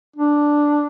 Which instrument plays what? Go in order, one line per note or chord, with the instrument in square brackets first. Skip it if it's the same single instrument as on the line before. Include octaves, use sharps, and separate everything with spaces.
[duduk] D4